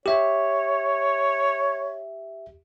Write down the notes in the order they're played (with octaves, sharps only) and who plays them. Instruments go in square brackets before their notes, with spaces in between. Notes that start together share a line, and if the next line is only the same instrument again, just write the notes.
[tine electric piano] G4 E5 [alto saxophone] C#5